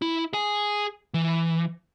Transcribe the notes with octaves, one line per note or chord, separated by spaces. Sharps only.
E4
G#4 G#5
E3